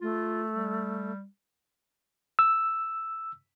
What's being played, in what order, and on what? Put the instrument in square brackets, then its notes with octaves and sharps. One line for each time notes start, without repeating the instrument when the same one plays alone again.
[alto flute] A3 [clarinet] F4
[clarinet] G3
[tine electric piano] E6